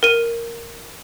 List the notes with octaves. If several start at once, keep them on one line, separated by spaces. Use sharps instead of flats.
A#4 D#7